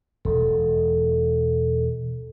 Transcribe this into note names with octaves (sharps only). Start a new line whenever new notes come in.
E1 A4